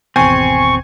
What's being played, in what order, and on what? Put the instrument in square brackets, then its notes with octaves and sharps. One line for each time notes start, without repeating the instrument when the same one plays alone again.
[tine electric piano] G#1 E2 B2 [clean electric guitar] C4 [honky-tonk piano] G#5 [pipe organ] C#6